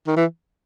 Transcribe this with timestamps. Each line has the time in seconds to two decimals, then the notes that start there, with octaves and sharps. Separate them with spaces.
0.08 D#3
0.16 E3